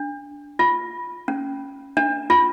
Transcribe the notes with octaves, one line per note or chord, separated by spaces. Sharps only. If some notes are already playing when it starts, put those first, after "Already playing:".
Already playing: D4
F4
C#4
D4
F4